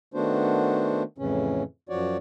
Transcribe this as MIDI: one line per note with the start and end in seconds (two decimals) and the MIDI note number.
0.14 1.03 51
0.14 1.03 57
0.14 1.03 59
0.14 1.03 62
0.14 1.03 66
0.14 1.03 72
1.18 1.63 41
1.18 1.63 45
1.18 1.63 49
1.18 1.63 52
1.18 1.63 61
1.89 2.17 42
1.89 2.17 53
1.89 2.17 66
1.89 2.17 73
1.89 2.17 74